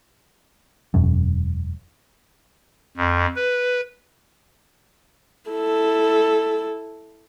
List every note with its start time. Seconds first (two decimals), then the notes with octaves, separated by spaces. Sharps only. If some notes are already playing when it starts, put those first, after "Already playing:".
0.94 E1 F#2
2.97 F2
3.36 B4
5.50 E4 A4